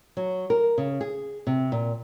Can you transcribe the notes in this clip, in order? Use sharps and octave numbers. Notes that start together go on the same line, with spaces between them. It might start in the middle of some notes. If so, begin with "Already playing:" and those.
F#3
A#4
C#3
G#4
C3
A#2